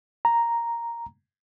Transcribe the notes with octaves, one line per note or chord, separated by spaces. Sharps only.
A#5